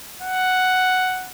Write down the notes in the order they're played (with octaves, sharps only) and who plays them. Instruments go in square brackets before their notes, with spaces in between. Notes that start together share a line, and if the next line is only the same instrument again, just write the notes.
[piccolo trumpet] F#5